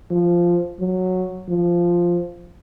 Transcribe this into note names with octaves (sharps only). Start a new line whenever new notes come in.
F3
F#3
F3